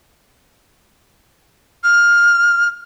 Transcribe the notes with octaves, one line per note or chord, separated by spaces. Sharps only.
F6